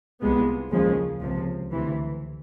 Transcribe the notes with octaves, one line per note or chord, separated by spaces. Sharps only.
C2 C3 F3 G#3 B3
D#2 C#3 F3 G#3
C#2 C3 F3
D2 C3 E3